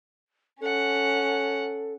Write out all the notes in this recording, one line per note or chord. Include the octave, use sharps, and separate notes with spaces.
C#4 A4 F#5